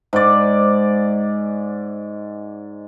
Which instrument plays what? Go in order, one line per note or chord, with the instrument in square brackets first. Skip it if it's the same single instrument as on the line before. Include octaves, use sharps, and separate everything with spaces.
[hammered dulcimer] G#2 D5